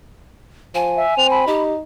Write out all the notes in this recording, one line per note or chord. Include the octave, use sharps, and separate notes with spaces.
F3 G#5
E5
C4 F7
B5
D#4 G4